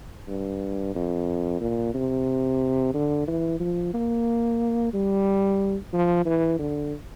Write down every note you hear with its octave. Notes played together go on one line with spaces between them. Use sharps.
G2
F2
A#2
C3
D3
E3
F3
A#3
G3
F3
E3
D3